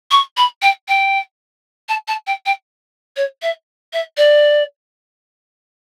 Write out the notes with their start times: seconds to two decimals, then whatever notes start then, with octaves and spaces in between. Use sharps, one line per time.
0.11 C#6
0.37 B5
0.62 G5
0.88 G5
1.88 A5
2.07 A5
2.26 G5
2.45 G5
3.16 C#5
3.42 E5
3.93 E5
4.17 D5